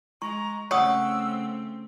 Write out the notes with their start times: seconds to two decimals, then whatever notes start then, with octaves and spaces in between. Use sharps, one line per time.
0.22 G#3 A#5 C#6
0.71 C#3 A3 C4 C#5 F#5 C#6 D#6 E6